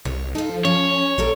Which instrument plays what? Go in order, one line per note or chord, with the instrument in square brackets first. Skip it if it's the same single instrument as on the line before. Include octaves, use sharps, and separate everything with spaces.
[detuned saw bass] C2 [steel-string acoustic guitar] C#5
[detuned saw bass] D#4 [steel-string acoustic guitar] F4 A4
[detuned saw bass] F3
[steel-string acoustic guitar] F3 [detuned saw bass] C#4 [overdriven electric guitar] C#5
[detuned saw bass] A#1 [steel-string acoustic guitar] G3 A4 A#4